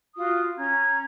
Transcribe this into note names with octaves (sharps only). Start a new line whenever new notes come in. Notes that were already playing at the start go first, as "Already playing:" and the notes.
F4 F#4 D#6
C#4 A#5 G#6